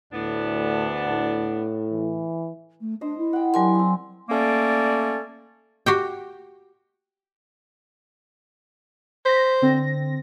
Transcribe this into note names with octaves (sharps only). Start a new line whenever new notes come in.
D2 A2 B3 D4
A2
E3
A3
D4 C5 D#5
E4
F#5 G5
F#3 D4 G4 A#4 G#5 C6
C4 D#6
A3 A#3 C#4 D5
F#4 G4 G5
C5 A#6 B6
D3 C4 A#6